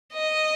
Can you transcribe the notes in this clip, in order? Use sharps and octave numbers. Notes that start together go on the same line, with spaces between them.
D#5